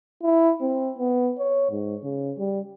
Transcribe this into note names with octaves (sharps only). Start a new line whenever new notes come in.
E4
C4
B3
C#5
G#2
C#3
G3